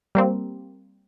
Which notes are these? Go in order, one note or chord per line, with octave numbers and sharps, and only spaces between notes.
G3 A#3 C4